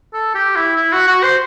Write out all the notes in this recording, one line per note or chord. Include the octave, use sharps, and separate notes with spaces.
A4
G4
E4
E4
F#4
F#4
C5